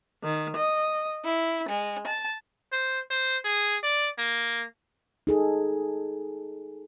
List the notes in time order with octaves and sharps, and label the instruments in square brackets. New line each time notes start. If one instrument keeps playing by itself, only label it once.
[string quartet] D#3
D#5
E4
G#3
A5
[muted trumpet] C5
C5
G#4
D5
A#3
[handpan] D#4 G#4 A4